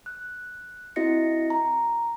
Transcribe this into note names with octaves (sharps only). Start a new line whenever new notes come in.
F#6
C4 E4 F#4 D#5 A#6 C#7
A#5